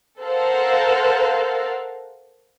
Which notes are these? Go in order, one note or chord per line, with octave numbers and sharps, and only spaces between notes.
A4 A#4 C5 F5 F#5